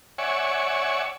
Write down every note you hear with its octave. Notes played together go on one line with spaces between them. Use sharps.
C#5 D5 E5 F#5 G#5 C#6